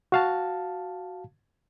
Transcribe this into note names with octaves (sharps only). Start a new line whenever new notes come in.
F#4 F5 A5